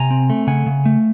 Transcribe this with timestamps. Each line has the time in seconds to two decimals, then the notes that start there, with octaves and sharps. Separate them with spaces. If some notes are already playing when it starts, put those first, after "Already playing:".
Already playing: C3 G#5 A#5
0.10 C4
0.30 A3
0.47 C#3 F#5 G#5
0.66 C#3
0.86 A3